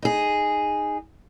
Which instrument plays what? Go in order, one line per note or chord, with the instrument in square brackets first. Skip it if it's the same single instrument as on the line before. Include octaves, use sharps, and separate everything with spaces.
[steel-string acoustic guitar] D#4 G#4